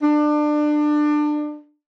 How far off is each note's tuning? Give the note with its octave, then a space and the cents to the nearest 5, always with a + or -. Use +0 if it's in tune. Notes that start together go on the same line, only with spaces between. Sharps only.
D4 +25